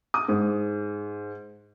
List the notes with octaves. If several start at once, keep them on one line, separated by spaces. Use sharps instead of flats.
D#6
G#2